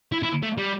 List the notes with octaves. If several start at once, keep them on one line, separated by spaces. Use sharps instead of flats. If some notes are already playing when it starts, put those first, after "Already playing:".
E4
E4
A3
G3